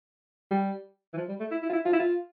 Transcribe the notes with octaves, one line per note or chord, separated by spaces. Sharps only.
G3
E3
F3
G3
A3
E4
E4
F4
E4
F4
E4
F4